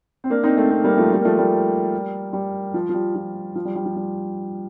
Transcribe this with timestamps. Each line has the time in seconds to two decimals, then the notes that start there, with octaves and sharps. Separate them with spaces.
0.24 C4
0.30 A#3 D4
0.43 C4 D#4
0.57 A3 C4
0.71 A3 C4
0.84 G3 A#3
0.97 F3 A3
1.12 G3
1.19 A#3
1.25 F3 A3
1.38 G3 A#3
2.33 G3
2.74 F3
2.89 F3
2.94 G3
3.15 F3
3.55 F3
3.65 G3
3.76 G3
3.86 F3
3.96 G3